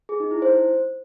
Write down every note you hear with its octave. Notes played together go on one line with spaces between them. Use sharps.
G#4
D#4
E4
C5